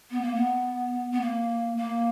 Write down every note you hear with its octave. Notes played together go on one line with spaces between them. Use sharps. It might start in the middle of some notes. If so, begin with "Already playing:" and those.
B3
A#3
B3
B3
A#3
A#3